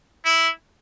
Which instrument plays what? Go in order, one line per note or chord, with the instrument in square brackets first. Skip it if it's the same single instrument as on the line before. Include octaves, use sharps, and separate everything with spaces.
[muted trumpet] E4